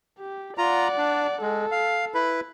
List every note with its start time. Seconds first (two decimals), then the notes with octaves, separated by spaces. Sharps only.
0.19 G4
0.58 F4 D5 F#5 A#5
0.97 D4
1.41 G#3 A4
1.71 F5
2.14 E4 B4